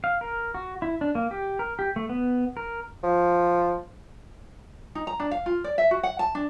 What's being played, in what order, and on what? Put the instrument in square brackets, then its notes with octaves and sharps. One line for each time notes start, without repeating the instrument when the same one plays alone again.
[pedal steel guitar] F5
A#4
F#4
E4
D4
A#3
G4
A#4
G4
A3
B3
A#4
[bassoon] F3
[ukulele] D#4
A#5
D4
F5
F4
D5
E5
F#4
F#5
A5
D4